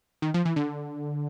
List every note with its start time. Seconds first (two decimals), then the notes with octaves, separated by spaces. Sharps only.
0.22 D#3
0.34 F3
0.45 E3
0.56 D3